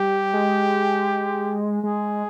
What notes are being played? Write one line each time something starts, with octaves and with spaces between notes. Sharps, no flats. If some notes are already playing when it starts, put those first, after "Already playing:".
Already playing: G3 G4
G#3
G#3 G#4